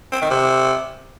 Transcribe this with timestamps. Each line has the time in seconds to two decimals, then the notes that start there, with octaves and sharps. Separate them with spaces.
0.12 C4
0.21 D#3
0.31 C3